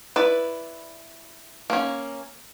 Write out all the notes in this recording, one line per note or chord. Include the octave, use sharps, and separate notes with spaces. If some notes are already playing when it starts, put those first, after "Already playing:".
E4 B4 D5
A#3 C#4